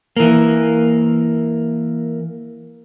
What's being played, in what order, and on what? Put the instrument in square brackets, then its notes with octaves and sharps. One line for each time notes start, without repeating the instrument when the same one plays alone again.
[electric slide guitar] E3 A#3